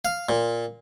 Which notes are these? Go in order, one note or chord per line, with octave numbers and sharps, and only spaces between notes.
F5
A#2